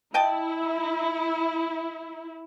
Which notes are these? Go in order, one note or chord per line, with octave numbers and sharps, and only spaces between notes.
E4 D#5 G5 A5